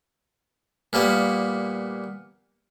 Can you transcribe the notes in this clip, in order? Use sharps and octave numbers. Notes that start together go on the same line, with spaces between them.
A#2 G3 A#3 B3